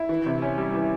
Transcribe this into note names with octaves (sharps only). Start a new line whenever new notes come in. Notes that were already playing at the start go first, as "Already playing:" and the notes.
Already playing: E4
E3
C3
C#4
G3
E3